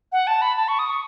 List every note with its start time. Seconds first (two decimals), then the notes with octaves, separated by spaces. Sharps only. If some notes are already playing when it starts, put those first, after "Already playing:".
0.12 F#5
0.27 A5
0.42 B5
0.57 A5
0.68 C#6
0.79 D#6
0.90 C#6